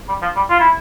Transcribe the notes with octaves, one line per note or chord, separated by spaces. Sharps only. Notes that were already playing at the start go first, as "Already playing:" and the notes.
G3
F3
G3
F4
E4